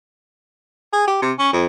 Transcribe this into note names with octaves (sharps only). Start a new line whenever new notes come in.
G#4
G4
C3
C#4
F2